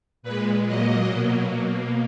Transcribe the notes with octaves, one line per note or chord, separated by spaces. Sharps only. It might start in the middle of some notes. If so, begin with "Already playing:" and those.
A#2 G#3 B4
A#2 F#3 A#3 D#5
B2 F#3 A#3
B2 A#3